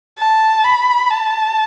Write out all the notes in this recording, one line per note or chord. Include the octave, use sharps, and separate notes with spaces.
A5
B5
A5